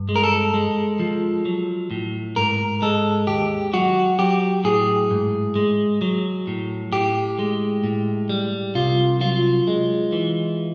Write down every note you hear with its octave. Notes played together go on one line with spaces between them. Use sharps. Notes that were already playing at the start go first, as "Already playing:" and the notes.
Already playing: G2
G#3
A#4
A4
G#3
F3
F#3
A2
G#2 A#4
G#3 A4
D#2 G4
F#3 F#4
F#3 G4
A2 G#4
G#2
G#3
F#3
A2
A2 G4
G#3
A2
G3
C2 F4
F#3 F4
G#3
E3